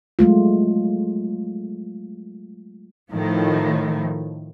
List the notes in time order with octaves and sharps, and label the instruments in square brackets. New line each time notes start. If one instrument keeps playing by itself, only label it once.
[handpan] F#3 G#3 A3 F4
[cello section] A2 D#3 F3